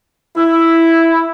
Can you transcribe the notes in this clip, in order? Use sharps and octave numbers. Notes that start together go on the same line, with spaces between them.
E4